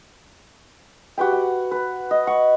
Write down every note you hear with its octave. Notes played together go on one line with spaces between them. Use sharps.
F#4 G4 B4 G5
F#5
B4
D#5
F#5 C#6